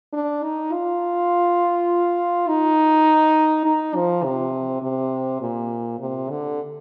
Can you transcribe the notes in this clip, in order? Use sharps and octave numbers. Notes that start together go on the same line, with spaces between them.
D4
D#4
F4
D#4
D#4
F3
C3
C3
A#2
C3
D3